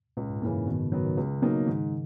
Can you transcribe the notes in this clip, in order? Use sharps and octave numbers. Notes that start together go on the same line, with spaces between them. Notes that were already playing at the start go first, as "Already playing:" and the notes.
C#2 A#2
G#2
F#2 C#3 E3 A#3
G#2
B2 D#3
C#3
D#3 F#3 B3
D#3
C#2 C#3
B2 F#3 A#3 D#4
G#2 D#3